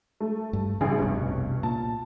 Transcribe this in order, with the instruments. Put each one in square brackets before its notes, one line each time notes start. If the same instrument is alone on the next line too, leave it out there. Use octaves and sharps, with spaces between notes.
[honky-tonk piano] A3
[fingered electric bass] G2
[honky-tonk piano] A1 G#4 [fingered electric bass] C#3 G3
[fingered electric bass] F1 C2 B2 [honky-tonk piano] G2 C#4
[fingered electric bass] A#2 [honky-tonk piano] A5